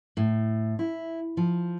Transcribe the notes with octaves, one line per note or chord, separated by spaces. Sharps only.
A2
E4
F3